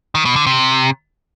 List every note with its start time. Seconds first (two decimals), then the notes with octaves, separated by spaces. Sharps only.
0.15 D#3
0.25 B2
0.36 D3
0.47 C3